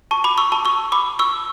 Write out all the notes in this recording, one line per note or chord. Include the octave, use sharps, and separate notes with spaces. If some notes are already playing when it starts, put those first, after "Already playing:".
A5 C#6
B5 D6
C#6 E6
A5 C#6
C#6 E6
B5 D6
C#6 E6